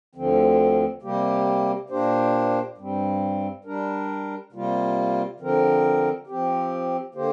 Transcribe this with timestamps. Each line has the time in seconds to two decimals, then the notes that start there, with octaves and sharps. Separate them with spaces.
0.15 D2 D3 F3 C4
1.02 C3 G3 A#3 G4
1.90 A#2 A#3 D4 G4 C5
2.78 G2 G3 C4
3.64 G3 D4 A#4
4.52 C3 G3 A#3 F4
5.40 D3 F3 C4 A#4
6.27 F3 C4 G4
7.15 D3 A#3 G4 C5